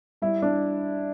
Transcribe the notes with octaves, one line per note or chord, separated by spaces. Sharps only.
G3 E4
D4